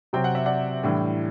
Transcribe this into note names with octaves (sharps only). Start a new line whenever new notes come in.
C3 F#3 C4 G5
F#5
E5
D5 F#5
A2 E3 G3 D4